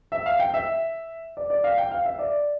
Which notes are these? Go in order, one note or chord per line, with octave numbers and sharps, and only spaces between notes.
E5
F5
G5
E5
D5
D5
F5
G5
F5
E5
D5